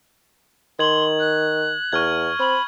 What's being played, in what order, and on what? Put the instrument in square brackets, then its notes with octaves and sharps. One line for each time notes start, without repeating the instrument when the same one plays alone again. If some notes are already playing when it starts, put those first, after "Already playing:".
[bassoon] D#3 [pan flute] C6 [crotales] G#6 F#7
[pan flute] F#6
[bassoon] E2 [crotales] C#6 F6 G#6
[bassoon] C4 [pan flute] B5